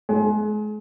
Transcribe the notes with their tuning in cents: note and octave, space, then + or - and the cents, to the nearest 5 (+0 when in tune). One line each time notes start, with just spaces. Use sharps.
G#3 +35